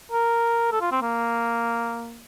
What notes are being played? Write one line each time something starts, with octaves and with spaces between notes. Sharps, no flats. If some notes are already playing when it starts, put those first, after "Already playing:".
A#4
A4
F4
C4
A#3